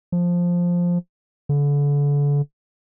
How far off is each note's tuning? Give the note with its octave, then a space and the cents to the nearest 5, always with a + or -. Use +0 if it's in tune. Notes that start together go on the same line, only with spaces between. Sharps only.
F3 +5
D3 -35